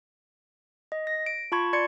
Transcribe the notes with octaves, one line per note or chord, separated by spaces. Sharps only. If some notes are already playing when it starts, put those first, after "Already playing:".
D#5
A#6
D7
F4 A5 B5 C#6 G#6
D5 C6 G#6 C#7